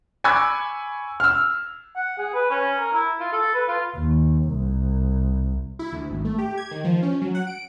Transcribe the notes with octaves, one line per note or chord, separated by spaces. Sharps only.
G#5 B5 C#6 D6 E6 G#6
E6 F6
F#5
G#4
B4
C#4
A#4
E4
F4
A4
B4
F4
D#2
C2
E4
D2
G#1
A3
G4
G#6
D#3
F3
C#4
F#3
F#5
D7